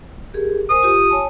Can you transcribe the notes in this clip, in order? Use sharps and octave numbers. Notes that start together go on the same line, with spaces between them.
G4 G#4 A#4
A#4 C5 G#5 D#6
F4 G4
C#5 G#5 A5